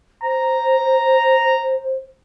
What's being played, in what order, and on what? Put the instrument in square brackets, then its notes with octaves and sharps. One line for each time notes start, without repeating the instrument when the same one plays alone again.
[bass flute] C5 [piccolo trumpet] A#5